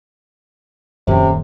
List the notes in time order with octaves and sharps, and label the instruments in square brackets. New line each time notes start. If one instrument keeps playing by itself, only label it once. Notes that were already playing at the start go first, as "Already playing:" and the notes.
[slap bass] D#1 [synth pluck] F#2 C#4 [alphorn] C3